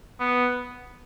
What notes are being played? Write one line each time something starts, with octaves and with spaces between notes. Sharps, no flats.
B3